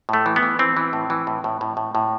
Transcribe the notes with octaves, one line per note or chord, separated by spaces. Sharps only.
A2 A3
E3
B3
E3
E3 C4
E3
A2
E3
A2
A2
A2
A2
A2